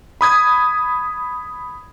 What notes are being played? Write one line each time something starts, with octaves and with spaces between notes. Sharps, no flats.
B5 D#6 G#6